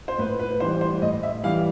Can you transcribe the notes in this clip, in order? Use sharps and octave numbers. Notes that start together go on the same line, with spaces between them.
C5
A2 B4
B4
E3 G3 C5
C5
A2 D#5
E5
E3 G3 F5